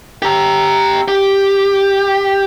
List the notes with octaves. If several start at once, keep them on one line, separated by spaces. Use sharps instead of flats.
G4 A#5
G4